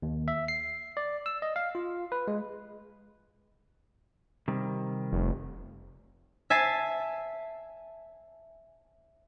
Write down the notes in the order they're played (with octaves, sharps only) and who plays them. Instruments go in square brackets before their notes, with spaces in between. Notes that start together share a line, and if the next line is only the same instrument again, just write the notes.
[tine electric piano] D#2
E5
C7
D5
E6
D#5
F5
F4
B4
G#3
[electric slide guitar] C3 D#3 G3
[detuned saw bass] F1
[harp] E5 G#5 A5 C7 D#7